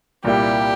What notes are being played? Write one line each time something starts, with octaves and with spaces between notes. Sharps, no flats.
C2 A#2 G3 A#3 E4 G4